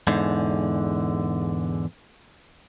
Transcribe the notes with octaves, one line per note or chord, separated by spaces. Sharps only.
E2 G#2 D3